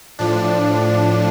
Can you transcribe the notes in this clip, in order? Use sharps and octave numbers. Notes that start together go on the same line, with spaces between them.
A2 F3 D4